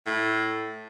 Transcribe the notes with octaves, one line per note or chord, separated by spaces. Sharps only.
A2